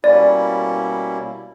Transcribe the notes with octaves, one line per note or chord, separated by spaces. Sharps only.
B2 G3 A#3 C#4 E4 D5